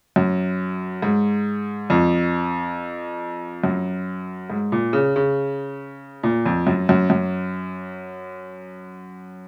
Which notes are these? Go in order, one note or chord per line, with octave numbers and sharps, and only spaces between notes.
F#2
G#2
F2
F#2
G#2
A#2
C#3
C#3
A#2
F2
F#2
F#2
F#2